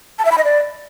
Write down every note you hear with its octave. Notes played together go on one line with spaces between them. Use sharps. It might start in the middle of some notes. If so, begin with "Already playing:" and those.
A5
E5
B5
D#5
D5